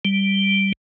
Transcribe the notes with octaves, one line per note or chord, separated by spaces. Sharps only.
G3